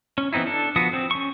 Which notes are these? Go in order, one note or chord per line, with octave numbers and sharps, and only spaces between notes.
C#4
E3 B3 C4 D#4 E4
D4 A4
F3 B3 F#4 D#6
C4
C#4 C#6